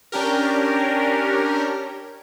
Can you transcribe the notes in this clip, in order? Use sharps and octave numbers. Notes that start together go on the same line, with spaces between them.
C#4 D4 G4 A#4